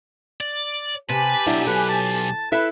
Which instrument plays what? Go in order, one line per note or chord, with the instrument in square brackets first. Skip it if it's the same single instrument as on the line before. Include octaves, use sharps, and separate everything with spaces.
[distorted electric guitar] D5
[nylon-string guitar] C3 [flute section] G4 G#5 [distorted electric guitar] B4 [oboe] A5
[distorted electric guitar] B1 [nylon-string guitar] F#3 D4 E4
[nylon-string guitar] A4 [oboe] B4
[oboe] A5
[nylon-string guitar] E4 A4 E5 [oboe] B4